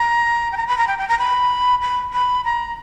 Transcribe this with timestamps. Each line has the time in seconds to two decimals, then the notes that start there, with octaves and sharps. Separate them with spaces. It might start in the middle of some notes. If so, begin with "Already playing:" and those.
Already playing: A#5
0.52 G5
0.57 A#5
0.67 B5
0.78 A#5
0.87 G5
0.98 G5
1.08 A#5
1.19 B5
1.82 B5
2.13 B5
2.45 A#5